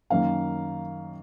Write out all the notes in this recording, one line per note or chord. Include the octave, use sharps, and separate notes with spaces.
F#2 D#3 A#3 C#4 F5